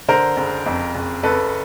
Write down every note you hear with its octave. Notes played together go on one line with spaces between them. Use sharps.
D3 A#4 C5
F#1
F2
F#1
F#1 A4 B4